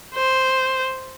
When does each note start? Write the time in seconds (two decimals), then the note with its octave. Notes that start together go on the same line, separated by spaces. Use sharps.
0.14 C5